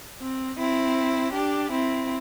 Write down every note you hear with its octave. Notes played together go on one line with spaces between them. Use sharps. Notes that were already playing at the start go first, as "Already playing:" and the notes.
C4
C4 E4
D4 G4
C4 E4